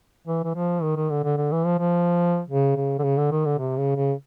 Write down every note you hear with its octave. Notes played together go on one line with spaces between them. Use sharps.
E3
E3
F3
D#3
D#3
D3
D3
D3
E3
F3
F3
C#3
C#3
D3
C#3
D3
D#3
D3
C3
C#3
C#3